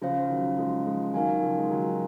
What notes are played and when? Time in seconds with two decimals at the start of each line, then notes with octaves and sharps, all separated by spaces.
0.01 C#3 F3 C#4 F4 C5 F5
0.29 D#3 F#3
0.59 F3 G#3
0.86 F3 G#3
1.14 D#3 F#3 D#4 A#4 F5 G#5
1.42 C#3 F3
1.58 G#3
1.70 D#3 F#3